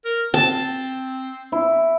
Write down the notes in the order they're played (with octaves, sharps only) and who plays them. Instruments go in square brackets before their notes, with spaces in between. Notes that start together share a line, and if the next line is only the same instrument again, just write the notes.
[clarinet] A#4
[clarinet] C4 [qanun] A5
[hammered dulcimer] E4